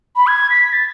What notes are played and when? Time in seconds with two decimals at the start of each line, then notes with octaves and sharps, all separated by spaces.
0.16 B5
0.27 G#6
0.50 B6
0.73 A6